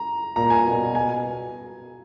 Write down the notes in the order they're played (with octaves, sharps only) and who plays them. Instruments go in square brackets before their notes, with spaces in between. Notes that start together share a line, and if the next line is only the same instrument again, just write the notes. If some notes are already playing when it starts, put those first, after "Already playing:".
Already playing: [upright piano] A#5
[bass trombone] A#2 [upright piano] A#5
[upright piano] G#5
[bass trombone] B2
[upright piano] G#5